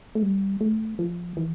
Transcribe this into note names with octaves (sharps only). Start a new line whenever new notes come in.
A3
G3
A3
F3
E3